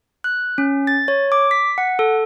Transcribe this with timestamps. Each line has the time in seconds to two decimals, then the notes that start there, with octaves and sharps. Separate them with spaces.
0.24 F#6
0.58 C#4
0.87 A6
1.08 C#5
1.32 D6
1.51 B6
1.78 F#5
1.99 A4